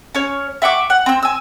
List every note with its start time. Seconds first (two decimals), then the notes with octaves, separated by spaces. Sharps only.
0.15 C#4 C#5
0.62 E5 F#5 C#6 D6
0.90 F#5
1.06 C4 E6
1.23 G#5 E6